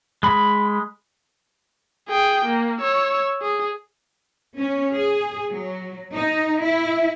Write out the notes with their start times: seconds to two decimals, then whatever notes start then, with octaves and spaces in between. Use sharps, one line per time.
0.23 G#3 B5
2.09 G#4 G5
2.46 A#3
2.80 C#5 E6
3.42 G#4
4.58 C#4
4.94 G#4
5.51 F#3
6.15 D#4
6.62 E4